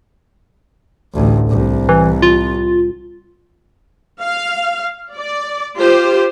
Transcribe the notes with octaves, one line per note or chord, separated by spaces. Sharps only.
A1 D2
C2
E3
F4
F5
D5
F4 G4 C5